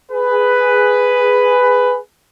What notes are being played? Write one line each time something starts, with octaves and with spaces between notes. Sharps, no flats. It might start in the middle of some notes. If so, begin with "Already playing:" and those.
G#4 B4